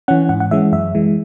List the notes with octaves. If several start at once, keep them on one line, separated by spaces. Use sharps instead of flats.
E3 C#4 F#5
G#2 F#5
F#5
E3 G#3 C#4 E5
F#2 E5
E3 G#3